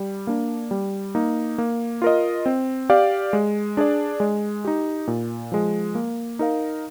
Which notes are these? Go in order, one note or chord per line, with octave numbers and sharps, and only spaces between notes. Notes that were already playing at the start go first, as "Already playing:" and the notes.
Already playing: G3
A#3 D4
G3
A#3 D#4
A#3
F4 A#4 D#5
C4
G4 D5 F5
G#3
D4 G#4 D5
G#3
D#4 G4
A#2
F3 G#3
A#3
D#4 A#4 F5